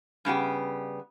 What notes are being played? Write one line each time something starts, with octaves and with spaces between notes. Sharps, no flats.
G2 C#3 B3 G4